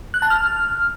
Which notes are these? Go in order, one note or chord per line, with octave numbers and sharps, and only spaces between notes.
F#6
A5
F6